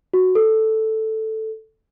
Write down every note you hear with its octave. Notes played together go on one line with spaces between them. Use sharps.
F#4
A4